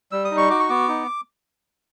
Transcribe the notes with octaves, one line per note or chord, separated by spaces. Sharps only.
G3 E6
D#6
D#4
C#6
F#4 D6
C#6
B3 D6
D#4